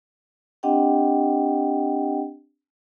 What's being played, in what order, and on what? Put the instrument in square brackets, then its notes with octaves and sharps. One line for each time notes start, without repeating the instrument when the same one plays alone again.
[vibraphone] C4 D4 G4 D#5 F#5 G5